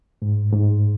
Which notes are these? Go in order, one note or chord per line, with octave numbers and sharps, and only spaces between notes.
G#2
G#2